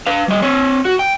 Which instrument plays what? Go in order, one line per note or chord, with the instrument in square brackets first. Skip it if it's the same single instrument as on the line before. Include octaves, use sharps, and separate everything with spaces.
[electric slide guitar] B4 F5
G3 D#5
C4 C#5
F#4
G5